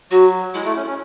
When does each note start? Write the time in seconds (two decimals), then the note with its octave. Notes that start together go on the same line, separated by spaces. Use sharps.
0.11 F#3 F#4
0.54 G#3 E4
0.65 A3
0.76 C#4
0.87 C#4